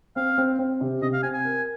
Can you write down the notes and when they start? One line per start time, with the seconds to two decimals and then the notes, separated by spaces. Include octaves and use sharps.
0.16 C4 F5
0.38 C4
0.59 C4
0.81 C3
1.02 C3 D#5
1.13 F5
1.23 C4 G#5
1.34 G#5
1.45 A#4